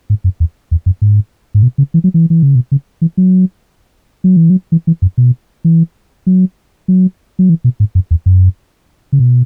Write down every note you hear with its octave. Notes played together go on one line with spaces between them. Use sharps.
G#2
F#2
E2
E2
F#2
G#2
G#2
B2
C#3
E3
F#3
E3
E3
C#3
B2
C#3
E3
F#3
F#3
E3
F#3
E3
E3
F#2
B2
E3
F#3
F#3
F#3
E3
B2
G#2
F#2
E2
F#2
C#3
B2